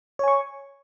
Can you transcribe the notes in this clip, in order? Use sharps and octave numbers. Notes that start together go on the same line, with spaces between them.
C#5 G#5 C#6